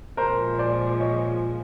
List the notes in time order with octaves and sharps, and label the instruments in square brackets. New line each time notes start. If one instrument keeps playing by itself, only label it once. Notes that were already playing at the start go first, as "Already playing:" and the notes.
[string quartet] A#2 F3 G#3 [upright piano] A#4 C5
[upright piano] C5 D5
C#5 D#5